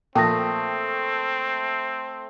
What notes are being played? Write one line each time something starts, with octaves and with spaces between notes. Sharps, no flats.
A#2 F3 A3 C4 G5 D#6 A#6